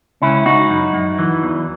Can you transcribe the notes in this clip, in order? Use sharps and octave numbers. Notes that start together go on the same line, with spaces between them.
C#2 C#4 E4
C#2 D#4 F#4
F#2
F#2
E3
E2